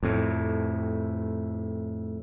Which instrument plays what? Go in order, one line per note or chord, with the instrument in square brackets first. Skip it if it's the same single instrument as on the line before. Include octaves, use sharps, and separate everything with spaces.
[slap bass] F2 A2